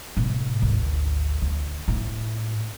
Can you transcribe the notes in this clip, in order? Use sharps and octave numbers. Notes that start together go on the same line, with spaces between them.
A2 C3
G#1 D2
D2
A2